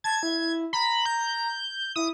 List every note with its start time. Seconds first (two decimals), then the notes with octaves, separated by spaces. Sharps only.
0.04 A5 G#6
0.23 E4
0.73 A#5 B5
1.06 G6
1.96 E4 D#6